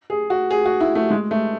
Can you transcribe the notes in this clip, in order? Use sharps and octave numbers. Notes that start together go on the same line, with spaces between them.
G#4
F#4
G#4
F#4
E4
A3
G#3
A3